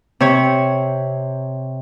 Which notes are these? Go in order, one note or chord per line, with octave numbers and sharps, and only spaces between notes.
C3 C#5